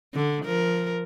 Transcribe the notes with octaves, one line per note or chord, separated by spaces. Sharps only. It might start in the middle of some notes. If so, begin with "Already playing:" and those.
D3
F3 A#4